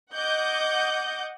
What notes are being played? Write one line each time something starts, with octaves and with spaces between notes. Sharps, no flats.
D#5 F#5 D6 G6